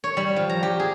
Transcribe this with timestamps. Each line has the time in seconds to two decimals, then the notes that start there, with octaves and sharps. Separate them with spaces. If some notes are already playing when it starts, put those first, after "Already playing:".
0.04 C#5
0.17 G3
0.36 F3
0.50 A#5
0.63 G4
0.80 G#4